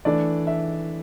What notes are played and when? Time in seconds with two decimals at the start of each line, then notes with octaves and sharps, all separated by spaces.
0.05 E3 A3 D4 D5
0.47 E5